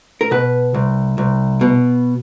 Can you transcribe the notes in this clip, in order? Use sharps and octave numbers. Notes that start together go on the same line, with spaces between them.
A#4
B2 B4
C2
C2
B2